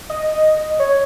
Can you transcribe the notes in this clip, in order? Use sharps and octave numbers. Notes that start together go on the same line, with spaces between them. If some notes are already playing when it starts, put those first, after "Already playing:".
D#5
C#5